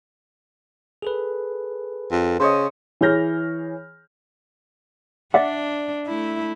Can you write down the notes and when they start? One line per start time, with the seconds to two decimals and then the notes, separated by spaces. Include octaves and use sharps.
1.02 G#4 A4 B4
2.11 F2
2.40 C#3 C5 C#5 D#5
3.01 E3 G#4 C#5 F6 G6 A#6
5.34 D4 D5 E5 F#5
6.06 A3 E4